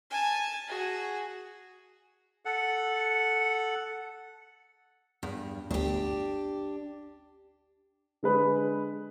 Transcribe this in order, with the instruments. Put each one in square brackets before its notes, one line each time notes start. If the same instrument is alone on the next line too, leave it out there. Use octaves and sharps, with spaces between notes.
[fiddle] G#5 A5
F#4 G#4
[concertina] A4 F#5
[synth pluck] E2 [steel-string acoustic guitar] G2
[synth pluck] G1 D2 [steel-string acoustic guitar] D4 G4
[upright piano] D3 G#3 B4